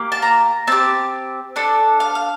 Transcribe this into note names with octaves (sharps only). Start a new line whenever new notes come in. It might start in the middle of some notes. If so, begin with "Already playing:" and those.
Already playing: A#3 G4
A5
A#5
C4 G4 A5
D4 A4
F5
F5